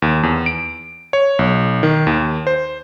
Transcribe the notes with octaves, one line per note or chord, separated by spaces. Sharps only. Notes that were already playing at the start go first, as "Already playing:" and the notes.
D#2
E2
D7
C#5
B1
D#3
D#2
C5